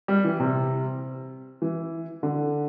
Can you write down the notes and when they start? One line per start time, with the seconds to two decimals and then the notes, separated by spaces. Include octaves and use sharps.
0.08 G3
0.24 E3
0.39 C3
1.62 E3
2.23 D3